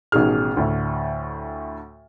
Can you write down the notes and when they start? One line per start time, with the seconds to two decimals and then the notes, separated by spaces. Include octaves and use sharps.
0.12 A1 B2 D#3 G#4 F6
0.57 D2 A2 D3